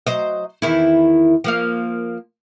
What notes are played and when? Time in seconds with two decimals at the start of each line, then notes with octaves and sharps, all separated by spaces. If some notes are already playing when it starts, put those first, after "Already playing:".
0.07 F#3 C5 D#5
0.62 E2 D#3 E4
1.44 F3 A#3 F5